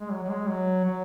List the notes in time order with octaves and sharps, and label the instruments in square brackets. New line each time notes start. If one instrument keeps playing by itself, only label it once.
[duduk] G#3
F#3
F#3
G#3
F#3
F#3